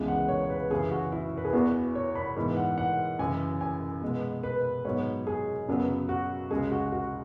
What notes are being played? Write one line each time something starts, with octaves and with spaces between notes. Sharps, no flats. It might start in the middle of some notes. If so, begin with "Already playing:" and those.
Already playing: C#2 C#3 E3 G#3 B3
F#5
C#5
B4
F#2 C#3 E3 G#4
F#4
E4
B4
G#4
E2 E3 B3 F#4
C#5
B5
G#2 E3 B3
F#5
F#5
F#2 C#3 E3 G#5
G#5
B2 G#3 B3
B4
G#2 F#3 B3 C#5
G#4
F#2 C#3 F#3 B3
F#4
C#2 C#3 G#3 G#4
F#4
F#4